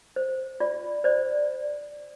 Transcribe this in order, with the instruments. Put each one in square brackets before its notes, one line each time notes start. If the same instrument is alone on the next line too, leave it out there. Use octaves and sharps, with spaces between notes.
[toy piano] C5
F4 D5
C5 D5